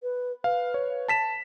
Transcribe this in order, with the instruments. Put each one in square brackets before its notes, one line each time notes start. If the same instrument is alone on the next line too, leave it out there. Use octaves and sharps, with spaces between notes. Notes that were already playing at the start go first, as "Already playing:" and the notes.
[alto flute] B4
[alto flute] B4 [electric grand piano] F5
[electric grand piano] C#5
A5 B6 E7